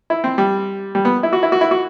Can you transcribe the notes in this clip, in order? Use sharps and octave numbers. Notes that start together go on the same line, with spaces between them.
E4
C4
G3
G3
B3
E4
F#4
E4
F#4
E4
F#4